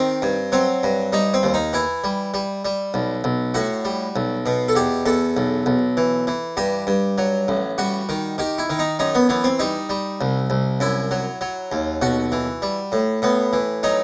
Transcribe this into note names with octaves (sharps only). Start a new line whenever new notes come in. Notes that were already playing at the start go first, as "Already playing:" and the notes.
Already playing: D#3 C4
G2
F#3 C4
G2
G3 D#4
C4
D#2
D#4
E3 E4
G3
G3
G3
B1
B1
A2 F#4
G3
B1
B2
A4
E2 G4
E2 A4
B1
B1
E3
E3
G2 G4
G2
F#3
A1
G3 F#4
D#3
D#3 G4
E4
D#3
D#4
F#2 D#4
B3
E3 B3
C4
G3 D#4
G3
C2
C2
F#2 E4
F#3
F#3
D#2
B1 F#4
E3
G3
A2
A2 B3
E3
F#3 D#4